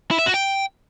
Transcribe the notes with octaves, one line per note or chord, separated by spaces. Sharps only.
E4
E5
F#4
G5